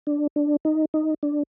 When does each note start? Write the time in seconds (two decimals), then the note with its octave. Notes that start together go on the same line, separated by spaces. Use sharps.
0.07 D4
0.36 D4
0.65 D#4
0.94 D#4
1.23 D4